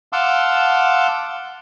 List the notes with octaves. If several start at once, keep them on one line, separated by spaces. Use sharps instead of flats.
F5 F#5 A5 C6 D6 E6